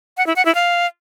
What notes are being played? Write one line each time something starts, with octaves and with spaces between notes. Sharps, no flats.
F#5
E4
F#5
E4
F5